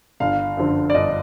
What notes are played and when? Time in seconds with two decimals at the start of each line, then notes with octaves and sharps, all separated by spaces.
0.20 G1 F5
0.57 F#2 D3 F3
0.90 D5
0.95 G1 D#5